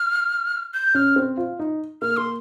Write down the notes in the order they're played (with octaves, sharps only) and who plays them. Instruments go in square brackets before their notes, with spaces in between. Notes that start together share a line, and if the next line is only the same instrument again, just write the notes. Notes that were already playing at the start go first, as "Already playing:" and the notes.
Already playing: [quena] F6
G6
[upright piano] C#4 [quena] F6
[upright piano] C4
F4
D#4
[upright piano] A#3 [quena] F6
[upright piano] A#3 [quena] C6